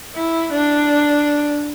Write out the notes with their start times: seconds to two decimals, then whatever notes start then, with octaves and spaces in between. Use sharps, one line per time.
0.15 E4
0.53 D4